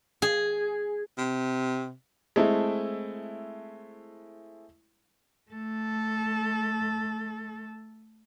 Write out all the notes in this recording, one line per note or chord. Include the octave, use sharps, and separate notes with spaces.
G#4
C3
G#3 A3 C4 E4
A3 A4